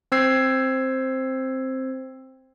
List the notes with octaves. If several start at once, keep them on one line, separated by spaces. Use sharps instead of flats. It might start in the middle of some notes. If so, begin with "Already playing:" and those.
C4 C5 E6 G#6 C7